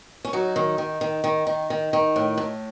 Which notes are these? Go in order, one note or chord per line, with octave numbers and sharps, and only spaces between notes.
C#4
F#3 D#4
D#3
D#3
D#3
D#3
D#3
D#3
D#3
A2
A2